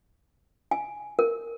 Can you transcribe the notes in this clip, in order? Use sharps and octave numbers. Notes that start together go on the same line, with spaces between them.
G#5
A#4